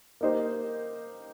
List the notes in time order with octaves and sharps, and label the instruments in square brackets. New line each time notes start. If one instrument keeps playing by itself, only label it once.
[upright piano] A#3 D#4 G4 C5